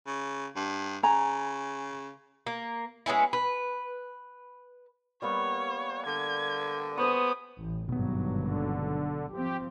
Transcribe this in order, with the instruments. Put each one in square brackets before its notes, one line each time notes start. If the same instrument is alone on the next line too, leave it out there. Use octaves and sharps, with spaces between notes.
[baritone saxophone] C#3
G2
[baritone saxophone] C#3 [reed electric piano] G#5 [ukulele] A#5
[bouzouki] A#3
G#3 B3 C#4 E4
B4
[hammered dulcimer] G3 A#3 B3 [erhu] C#5
[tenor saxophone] D3 [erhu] G#6
[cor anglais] B3 [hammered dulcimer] G#4 C5 C#6 [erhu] D#6
[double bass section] A1
[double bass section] G#1 G2 F#3 [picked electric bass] B2 B3
[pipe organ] D3
[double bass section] F3 C4 [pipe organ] G4